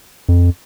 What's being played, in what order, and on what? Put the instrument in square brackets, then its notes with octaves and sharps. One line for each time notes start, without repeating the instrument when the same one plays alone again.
[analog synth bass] F2